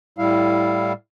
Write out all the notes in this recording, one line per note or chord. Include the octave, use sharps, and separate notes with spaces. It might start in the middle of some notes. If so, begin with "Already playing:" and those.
A2 G3 E4 F5